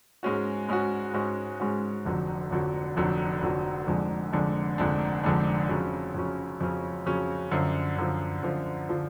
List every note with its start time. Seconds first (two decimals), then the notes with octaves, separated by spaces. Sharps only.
0.23 G#2 G#3 C#4 F#4
0.69 G#2 G#3 C#4 F#4
1.14 G#2 G#3 C#4 F#4
1.60 G#2 G#3 C#4 F#4
2.05 F1 F2 D3 F#3
2.50 F1 F2 D3 F#3
2.97 F1 F2 D3 F#3
3.42 F1 F2 D3 F#3
3.87 F1 F2 D3 G#3 D4
4.32 F1 F2 D3 G#3 D4
4.78 F1 F2 D3 G#3 D4
5.24 F1 F2 D3 G#3 D4
5.69 F2 C#3 F#3 C#4
6.14 F2 C#3 F#3 C#4
6.60 F2 C#3 F#3 C#4
7.06 F2 C#3 F#3 C#4
7.51 F#2 D3 F3
7.97 F#2 D3 F3
8.43 F#2 D3 F3
8.89 D3 F3